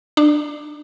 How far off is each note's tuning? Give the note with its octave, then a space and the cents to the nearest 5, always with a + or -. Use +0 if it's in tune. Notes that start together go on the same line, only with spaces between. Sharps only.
D4 +20